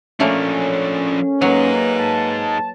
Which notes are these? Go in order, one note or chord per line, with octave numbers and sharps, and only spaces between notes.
F3 A3 A#3 C#4 D4
F#3 A#3 D#4 G#4 B4
A5